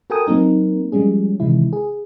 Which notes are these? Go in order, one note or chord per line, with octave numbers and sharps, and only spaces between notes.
F#4 A4 A#4 G5 G#5 D#6
F#3 A#3 C4 D#4 A#4
F3 G3 G#3 C#4 G#4
C3 D#3 E3 G#3 E4
G#4